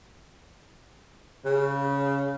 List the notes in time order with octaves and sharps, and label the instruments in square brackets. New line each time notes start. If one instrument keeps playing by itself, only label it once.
[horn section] C#3